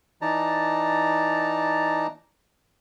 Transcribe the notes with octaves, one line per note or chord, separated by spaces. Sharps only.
E3 D#4 D5 A5 A#5